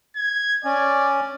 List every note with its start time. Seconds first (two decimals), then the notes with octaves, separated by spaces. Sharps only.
0.16 G#6
0.65 C#4 D5